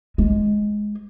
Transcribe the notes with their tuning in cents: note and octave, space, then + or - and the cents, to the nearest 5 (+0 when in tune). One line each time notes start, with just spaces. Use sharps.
G#3 +5